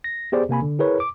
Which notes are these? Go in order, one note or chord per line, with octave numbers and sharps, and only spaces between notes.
A#6
B3 G4 G#4 C5 D5
C3 A#3 G#5 B5
D3
E4 G#4 A#4 B4 C#5
D6